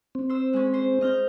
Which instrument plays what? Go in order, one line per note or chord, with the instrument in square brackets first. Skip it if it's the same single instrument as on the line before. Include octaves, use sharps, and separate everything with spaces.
[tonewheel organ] C4
[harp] C5 E6
G#3 C#4
C5
D#5 F6 G6